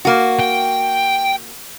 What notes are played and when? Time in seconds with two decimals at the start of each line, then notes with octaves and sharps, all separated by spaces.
0.05 A#3 F#4
0.40 G5